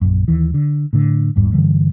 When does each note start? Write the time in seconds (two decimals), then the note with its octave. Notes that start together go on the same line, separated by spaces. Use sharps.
0.01 A#1 F#2
0.28 D#2 E3
0.54 D3
0.93 A2 D3
1.36 G1 E2 G#2 G3
1.52 G2 D3 E3 G3